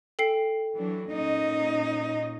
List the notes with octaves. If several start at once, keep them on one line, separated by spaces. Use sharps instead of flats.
A4 G5 C7
E3 F#3 D4
A#2 C#4 D#4 D#5